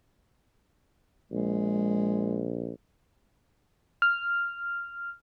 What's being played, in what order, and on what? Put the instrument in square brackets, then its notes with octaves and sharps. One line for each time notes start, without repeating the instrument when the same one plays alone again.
[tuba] A#1 [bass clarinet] G#3
[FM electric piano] F6